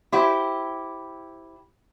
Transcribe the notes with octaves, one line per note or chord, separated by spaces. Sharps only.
E4 G4 C5